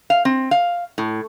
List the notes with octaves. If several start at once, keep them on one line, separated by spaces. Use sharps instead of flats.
F5
C4
F5
A2